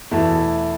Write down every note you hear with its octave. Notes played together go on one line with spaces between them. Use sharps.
E2 B2 A3 E4